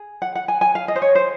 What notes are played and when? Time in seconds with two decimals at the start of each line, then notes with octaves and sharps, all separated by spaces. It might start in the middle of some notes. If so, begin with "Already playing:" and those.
Already playing: G#4
0.22 F#5
0.35 F#5
0.48 G#5
0.61 G#5
0.75 F5
0.88 D#5
0.96 C5
1.02 C#5
1.15 C5